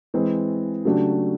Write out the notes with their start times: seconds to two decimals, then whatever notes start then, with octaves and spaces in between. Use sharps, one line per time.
0.14 E3 G#3 C4
0.85 C#3 F#3 A3 D4 G4